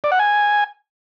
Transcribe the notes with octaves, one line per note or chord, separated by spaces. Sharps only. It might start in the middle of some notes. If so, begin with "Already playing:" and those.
D5
F#5
G#5